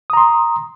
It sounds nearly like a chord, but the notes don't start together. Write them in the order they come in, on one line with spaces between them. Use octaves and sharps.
D#6 A#5 C6